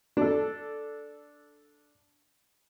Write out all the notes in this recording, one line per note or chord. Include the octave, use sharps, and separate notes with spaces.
D4 A4